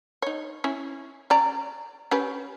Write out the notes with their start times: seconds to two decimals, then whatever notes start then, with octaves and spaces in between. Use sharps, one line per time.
0.22 D#4 C#5
0.64 C#4 E4
1.30 C#4 D5 A#5
2.11 C#4 G4 B4